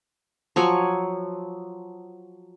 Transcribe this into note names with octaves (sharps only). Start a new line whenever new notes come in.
F3 F#3 G#5 C#6